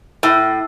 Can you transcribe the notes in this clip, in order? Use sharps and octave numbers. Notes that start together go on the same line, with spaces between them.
A2